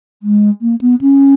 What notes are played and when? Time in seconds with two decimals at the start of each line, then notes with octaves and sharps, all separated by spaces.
0.23 G#3
0.62 A#3
0.81 B3
1.01 C#4